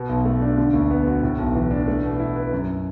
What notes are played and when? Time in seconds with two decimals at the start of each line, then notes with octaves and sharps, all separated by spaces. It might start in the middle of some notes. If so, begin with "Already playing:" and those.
Already playing: B2
0.09 B1
0.25 A3
0.42 D4
0.58 D3
0.74 D2
0.91 B3
1.07 F#4
1.23 A2
1.38 B1
1.55 E3
1.71 D4
1.87 A3
2.03 B2
2.19 E4
2.36 B4
2.52 F#2